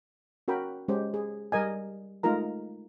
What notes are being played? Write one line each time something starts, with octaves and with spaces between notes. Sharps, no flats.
C#4 F#4 A#4 G5 B5
G#3 C#4 G4 C5
G#4
G3 A#4 D#5 G#5
G#3 A3 D#4 F4 A#4 A#5